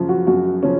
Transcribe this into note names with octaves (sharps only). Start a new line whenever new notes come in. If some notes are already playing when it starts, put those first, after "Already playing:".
Already playing: F#2 C#3 F3
F#4
F#2 F#4
C#3 F3 C#4